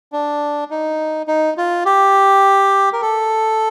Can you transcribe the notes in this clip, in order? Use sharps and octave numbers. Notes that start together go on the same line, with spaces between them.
D4
D#4
D#4
F4
G4
A#4
A4